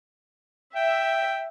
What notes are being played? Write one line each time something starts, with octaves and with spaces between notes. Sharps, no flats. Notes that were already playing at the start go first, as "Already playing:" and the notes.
E5 G5